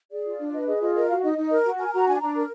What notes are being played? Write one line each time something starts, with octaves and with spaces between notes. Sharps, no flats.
G#4 D5
F4
D4
B4 D#5
G#4 D#5
F4 D#5
A#4 D#5
F#4 F5
D#4 D#5
D#4
A#4 D#5
F#4
A#4 G#5
F#4 A#5
D4 G#5
D4 A#5
A#4